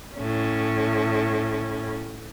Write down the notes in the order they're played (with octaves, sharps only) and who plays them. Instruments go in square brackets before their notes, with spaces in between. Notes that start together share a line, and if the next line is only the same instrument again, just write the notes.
[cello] A2 C#4